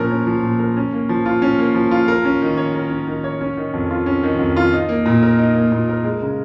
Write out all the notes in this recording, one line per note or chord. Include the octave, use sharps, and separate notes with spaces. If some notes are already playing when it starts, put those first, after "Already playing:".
Already playing: A#2 F3 C#4 A#4
C#4
F3
A#2
A#4
C#4
A#3
F3
F4
C#4
A#3
F3
F4
A#4
C#4
D#3
C#5
A#4
C#4
D#3
C#5
C#4
D#3
F2
F4
C#4
D#3
F2
F4
D#4
A#3
A#2
A#4
D#4
A#3
A#2
A#4
G#3
C#3